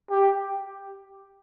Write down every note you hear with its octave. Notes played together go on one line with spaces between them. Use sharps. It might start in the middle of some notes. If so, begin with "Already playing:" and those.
G4